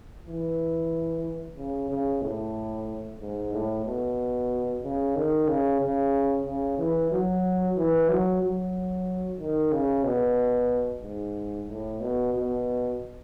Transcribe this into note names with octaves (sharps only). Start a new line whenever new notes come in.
E3
C#3
C#3
A2
G#2
A2
B2
C#3
D#3
C#3
C#3
C#3
E3
F#3
E3
F#3
F#3
D#3
C#3
B2
G#2
A2
B2
B2